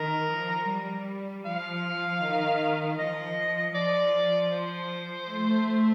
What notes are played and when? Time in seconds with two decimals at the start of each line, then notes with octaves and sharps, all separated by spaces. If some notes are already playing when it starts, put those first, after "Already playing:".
Already playing: D#3 A#4
0.30 F3
0.68 G3
1.44 F3 F5
2.22 D#3
2.98 F3 D#5
3.75 F3 D5
4.52 C5
5.29 A3